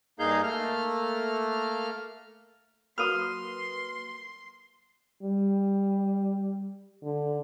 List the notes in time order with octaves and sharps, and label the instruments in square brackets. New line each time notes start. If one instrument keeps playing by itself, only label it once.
[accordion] G2 A#3 D#4 G#4 F5 G6
A3 A#3 F6
[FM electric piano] F#3 A#3 B4 [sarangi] C6 [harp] D#6 F6
[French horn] G3
D3